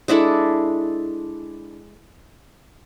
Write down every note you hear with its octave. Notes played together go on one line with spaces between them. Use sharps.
G#3 D4 E4 A4